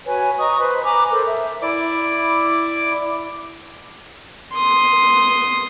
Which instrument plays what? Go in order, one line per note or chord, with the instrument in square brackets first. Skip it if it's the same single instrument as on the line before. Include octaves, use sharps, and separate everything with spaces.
[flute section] F#4 B4 C#5 G#5
D#5 A#5 C#6 D#6
B4 C5
G#5 A#5 B5 D6
A4 A#4 C5 G6
E5
[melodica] E4 D5 D6
[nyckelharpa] C6 D#6